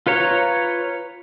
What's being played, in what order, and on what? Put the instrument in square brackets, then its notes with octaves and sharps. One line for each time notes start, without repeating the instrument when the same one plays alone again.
[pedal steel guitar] F4 B4 C#5 A#5